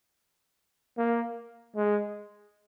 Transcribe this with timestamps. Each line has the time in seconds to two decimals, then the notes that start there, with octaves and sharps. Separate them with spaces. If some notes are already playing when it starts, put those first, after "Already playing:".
0.98 A#3
1.76 G#3